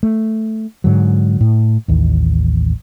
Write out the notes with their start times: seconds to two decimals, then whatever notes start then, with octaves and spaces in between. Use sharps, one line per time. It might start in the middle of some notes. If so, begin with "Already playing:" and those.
0.03 A3
0.84 G#2 D3 F#3
1.41 A2
1.88 A1 D#2